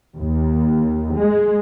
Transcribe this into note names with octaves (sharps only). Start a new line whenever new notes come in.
D#2
G#3